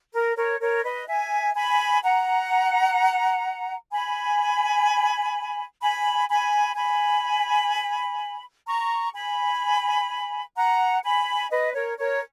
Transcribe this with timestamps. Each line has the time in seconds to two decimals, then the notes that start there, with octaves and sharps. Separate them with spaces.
0.13 A#4
0.36 A#4 C#5
0.60 A#4 C#5
0.83 B4 D#5
1.08 E5 G#5
1.55 G#5 B5
2.02 F#5 A#5
3.92 G#5 B5
5.82 G#5 B5
6.29 G#5 B5
6.76 G#5 B5
8.66 A#5 C#6
9.14 G#5 B5
10.56 F#5 A#5
11.03 G#5 B5
11.50 B4 D#5
11.74 A#4 C#5
11.98 A#4 C#5